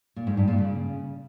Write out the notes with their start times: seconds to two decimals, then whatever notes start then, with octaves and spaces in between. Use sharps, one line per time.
0.16 A#2
0.27 G#2
0.37 G2
0.48 A#2
0.58 C#3